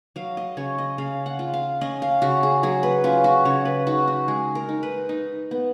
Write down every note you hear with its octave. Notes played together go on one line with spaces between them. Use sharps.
F#3 F5
D#5
C#3 C#5
D#5
C#3 F5
F#5
F4
F5
C#4 D#5
F5
C#3 F#4
G#4
F#3 G#4
B4
C#4 F4
F#4
C#3 C#5
B4
D#4 F#4
F#4
G#3 G#4
A#4
D#4
B4
D#4
B3